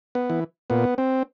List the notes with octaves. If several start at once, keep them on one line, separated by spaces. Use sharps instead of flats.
B3
E3
A#2 B3
C4